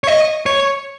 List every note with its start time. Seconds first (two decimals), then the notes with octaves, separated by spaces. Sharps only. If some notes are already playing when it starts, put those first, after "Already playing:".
0.04 C#5
0.07 D#5
0.46 C#5